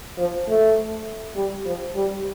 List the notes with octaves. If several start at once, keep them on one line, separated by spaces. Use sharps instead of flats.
F3
A3
G3
F3
G3